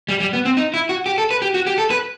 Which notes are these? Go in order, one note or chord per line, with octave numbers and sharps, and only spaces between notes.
G3
G3
B3
C4
D#4
E4
F#4
G4
A4
B4
G4
F#4
G4
A4
B4